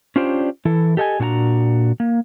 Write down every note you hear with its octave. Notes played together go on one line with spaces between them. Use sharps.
C#4 D4 F4 G4 C5 D5
E3 E4 A4
G4 A4 D#5 G5 G#5
A#2 D4 F#4 G#5 A#5
A#3